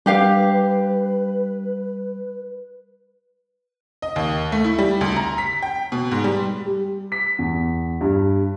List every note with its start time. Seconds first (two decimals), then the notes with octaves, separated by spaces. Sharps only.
0.06 G3 D4 G4 B4 F5
4.02 D#5
4.16 D#2
4.52 A3
4.64 E4
4.78 G3
5.01 D2
5.16 A#5
5.38 B6
5.62 G5
5.92 B2
6.11 G#2
6.24 G3
6.66 G3
7.12 B6
7.39 E2
8.01 G2